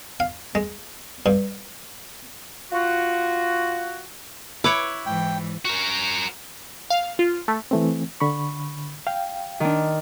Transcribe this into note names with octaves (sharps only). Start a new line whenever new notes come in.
F5
G#3
G2
F4 F#4
E4 B4 C#5 D6
G#2 E3 G5
F#4 A#4
F5
F4
A3
E3 A3 C4
D3 B5 C#6
F5 G5
D#3 D4